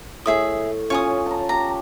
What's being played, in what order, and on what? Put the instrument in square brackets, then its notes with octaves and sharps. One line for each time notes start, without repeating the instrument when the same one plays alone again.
[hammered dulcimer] A2 [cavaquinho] G#4 E5 D#6
[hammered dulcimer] C#4 F4 [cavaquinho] C#5 G#5 D#6
[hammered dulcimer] A5 A#5
[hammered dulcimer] G4 [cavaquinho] A#5